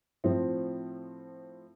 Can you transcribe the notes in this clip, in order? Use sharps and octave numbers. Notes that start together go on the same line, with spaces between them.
A2 F3 C4